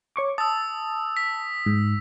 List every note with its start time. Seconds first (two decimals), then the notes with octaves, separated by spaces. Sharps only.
0.16 C#5 C#6 D6
0.38 A5 D#6 E6
1.17 B6
1.66 G#2